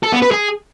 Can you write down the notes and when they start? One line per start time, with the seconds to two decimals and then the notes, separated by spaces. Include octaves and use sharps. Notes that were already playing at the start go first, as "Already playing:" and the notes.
0.03 A4
0.12 B3
0.22 B4
0.31 G#4